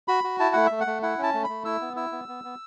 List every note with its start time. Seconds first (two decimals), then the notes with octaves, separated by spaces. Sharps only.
0.08 F#4 B5
0.24 F#4
0.39 E4 A5
0.53 A3 F#5
0.66 A3 E5
0.80 F#5
0.87 A3
1.02 E4 F#5
1.18 C#4
1.23 A5
1.34 A3
1.44 A3 B5
1.65 E4 E6
1.81 B3
1.96 E4 E6
2.12 B3
2.28 B3
2.44 B3